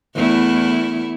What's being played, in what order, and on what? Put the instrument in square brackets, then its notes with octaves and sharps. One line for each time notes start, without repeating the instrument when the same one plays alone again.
[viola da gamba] E2 A3 E4